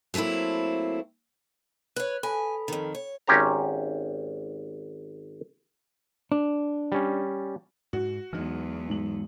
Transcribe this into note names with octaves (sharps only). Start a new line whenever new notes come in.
F#3 A3 A#3 C4 E4
B4 C#5 F#6
A4 G#5 B5
F2 D#3
C#5
G#1 C#4 G4 C5 A#5
D4
G3 C#4
G#2 F#4
E2 E3 F#3 G#3 D#4 F6
G#2 F#7